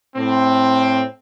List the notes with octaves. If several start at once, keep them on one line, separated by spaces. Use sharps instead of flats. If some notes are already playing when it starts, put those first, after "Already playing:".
A2 C4